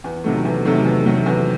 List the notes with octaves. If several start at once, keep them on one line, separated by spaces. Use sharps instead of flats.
E2
C3 D#3 F#3 A3
E2
C3 D#3 F#3 A3
E2
C3 D#3 F#3 A3
E2